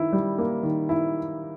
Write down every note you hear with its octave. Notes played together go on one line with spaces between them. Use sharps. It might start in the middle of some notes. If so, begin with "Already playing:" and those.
Already playing: D#3 E4
G3
A#3
D#3
E4